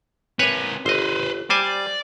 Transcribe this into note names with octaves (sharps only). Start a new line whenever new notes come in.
C4 A#4 B4 C#5 G#5
G1 B4 C5 D#5
G3 C5 D5 G#5